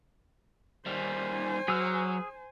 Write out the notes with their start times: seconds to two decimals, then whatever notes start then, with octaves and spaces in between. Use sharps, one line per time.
0.86 D#3 G3 C5 G#5
1.68 F#3 G#4 E6 F6